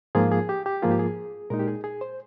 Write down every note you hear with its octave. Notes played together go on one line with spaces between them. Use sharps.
G#2 F3 A#3 F4 G#4
G#4
G4
G4
G#2 F3 A#3 F4 G#4
G4
G#4
A#2 G#3 D#4 A#4
G4
G#4
G#4
C5